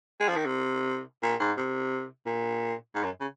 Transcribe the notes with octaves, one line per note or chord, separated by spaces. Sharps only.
G#3
F3
D#3
C3
A#2
G#2
C3
A#2
G#2
F#2
C#3